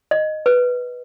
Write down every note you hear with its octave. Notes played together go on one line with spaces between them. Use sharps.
D#5
B4